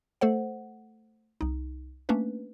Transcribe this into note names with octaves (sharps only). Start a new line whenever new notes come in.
A3 A4 C5 F#5
C2 D#4
A3 A#3 C#4 D4 B4